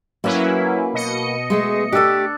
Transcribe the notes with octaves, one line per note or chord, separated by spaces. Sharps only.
F#3 A#3 C#4 E4 B4
B2 D#5 C#7
G#3 A3 G#4
A3 D4 G4 A4